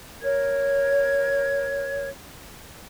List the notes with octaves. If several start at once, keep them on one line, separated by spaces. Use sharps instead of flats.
A#4 C#5 G#6